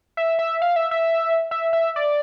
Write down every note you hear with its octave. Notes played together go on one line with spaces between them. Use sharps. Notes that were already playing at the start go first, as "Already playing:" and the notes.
E5
E5
F5
E5
E5
E5
E5
D5